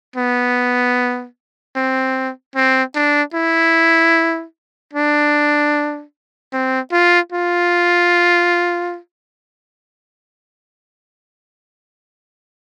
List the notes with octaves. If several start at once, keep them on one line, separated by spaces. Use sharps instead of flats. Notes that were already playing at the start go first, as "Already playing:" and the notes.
B3
C4
C4
D4
E4
D4
C4
F4
F4